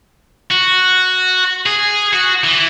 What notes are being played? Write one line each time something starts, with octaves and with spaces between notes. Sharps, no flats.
F#4
G#4
F#4
E3